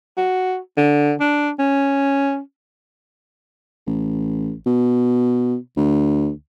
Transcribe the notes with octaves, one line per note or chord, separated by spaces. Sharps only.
F#4
D3
D4
C#4
A1
B2
D2